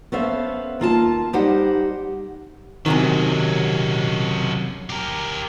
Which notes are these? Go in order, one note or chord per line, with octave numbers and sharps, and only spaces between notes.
B3 C#4 A4 C5 E5 F5
D#2 A#3 F4 A5
G3 D#4 G4 C5 D#5 F#5
F#2 C3 D#3 F#3 G#3
G4 A#4